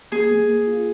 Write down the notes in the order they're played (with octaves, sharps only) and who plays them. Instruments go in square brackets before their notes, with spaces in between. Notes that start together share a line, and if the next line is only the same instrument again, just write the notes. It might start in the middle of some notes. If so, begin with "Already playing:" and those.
[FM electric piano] A#3 [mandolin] G#4
[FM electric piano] A#3
A#4
F4